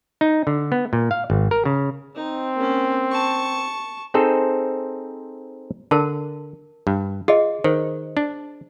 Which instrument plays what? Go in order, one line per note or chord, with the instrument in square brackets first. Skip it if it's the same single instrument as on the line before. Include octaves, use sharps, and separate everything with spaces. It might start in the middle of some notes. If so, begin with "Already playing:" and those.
[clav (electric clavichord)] D#4
D3
B3
A#2
F5
G#1
A#4
C#3
[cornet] C4 [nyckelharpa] D#4
[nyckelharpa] A#3 C#4
A5 C#6
[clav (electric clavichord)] C4 D#4 G#4 A4 C5
[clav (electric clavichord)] D3 [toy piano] A#4 A5
[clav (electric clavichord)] G2
[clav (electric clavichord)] F4 [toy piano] G#4 D#5
[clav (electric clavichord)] D#3 [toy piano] C5
[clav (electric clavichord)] D4